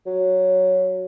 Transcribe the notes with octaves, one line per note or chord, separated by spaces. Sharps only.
F#3